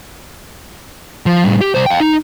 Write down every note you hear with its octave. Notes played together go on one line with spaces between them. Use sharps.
F3
A2 G3
G4
C2 C5
F5 G5
D#4